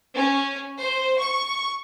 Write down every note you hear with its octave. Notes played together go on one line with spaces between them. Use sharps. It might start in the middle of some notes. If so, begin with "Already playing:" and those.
C#4
C5
C#6